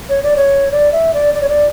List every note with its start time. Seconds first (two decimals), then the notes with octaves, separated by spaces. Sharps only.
0.09 C#5
0.23 D5
0.36 C#5
0.72 D5
0.92 E5
1.14 D5
1.34 D5
1.42 C#5
1.49 D5